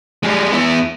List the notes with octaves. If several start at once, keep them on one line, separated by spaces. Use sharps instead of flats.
G3 G#3
B3 E4